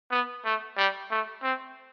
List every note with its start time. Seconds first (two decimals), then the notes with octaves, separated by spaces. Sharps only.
0.11 B3
0.45 A3
0.77 G3
1.11 A3
1.43 C4